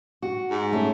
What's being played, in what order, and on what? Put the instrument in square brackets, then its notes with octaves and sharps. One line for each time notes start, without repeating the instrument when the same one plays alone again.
[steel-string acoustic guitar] F#4
[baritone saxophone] G#2
[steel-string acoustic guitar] A3 C#4